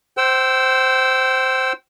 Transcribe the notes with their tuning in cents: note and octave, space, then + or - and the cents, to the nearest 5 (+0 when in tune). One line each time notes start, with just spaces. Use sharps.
C5 +0 G5 -35 E6 +0